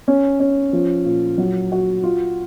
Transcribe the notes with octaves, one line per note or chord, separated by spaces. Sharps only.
C#4
C#4
F3
A#2
F#3
F#4
F4